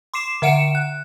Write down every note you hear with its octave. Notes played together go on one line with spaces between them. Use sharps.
C6 D6 C7 E7
D3 E5 F#5 C#7 D7 E7
F#6